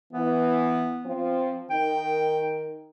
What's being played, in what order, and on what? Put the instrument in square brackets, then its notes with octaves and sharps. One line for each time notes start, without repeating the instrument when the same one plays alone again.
[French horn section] E3 [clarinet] B3
[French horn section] F3 C4
[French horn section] D#3 [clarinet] G5